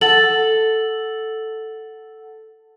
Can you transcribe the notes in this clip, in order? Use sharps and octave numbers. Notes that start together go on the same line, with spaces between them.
A4 F#5 A6 F#7